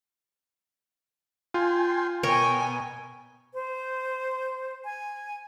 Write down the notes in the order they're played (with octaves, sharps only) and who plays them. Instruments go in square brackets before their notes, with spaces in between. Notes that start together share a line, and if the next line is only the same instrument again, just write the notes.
[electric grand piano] F4 [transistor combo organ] G5 G#5 C6
[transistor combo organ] B2 [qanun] A#4 C#5 [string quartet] G5 G#5
[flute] C5
G#5